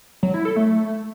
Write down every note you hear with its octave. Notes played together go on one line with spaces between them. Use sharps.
F#3
E4
A4
A3